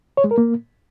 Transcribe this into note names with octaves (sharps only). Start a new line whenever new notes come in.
C#5
G#3
A#4
A#3